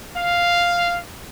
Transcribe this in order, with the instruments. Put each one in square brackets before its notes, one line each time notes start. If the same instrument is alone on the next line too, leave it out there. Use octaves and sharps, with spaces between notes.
[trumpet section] F5